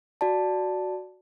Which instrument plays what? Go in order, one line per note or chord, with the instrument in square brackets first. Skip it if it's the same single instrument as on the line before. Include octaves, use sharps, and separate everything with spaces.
[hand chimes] F#4 D5 A5